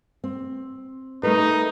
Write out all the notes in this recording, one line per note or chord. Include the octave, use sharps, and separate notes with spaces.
C4
A3 D#4 A#4 B4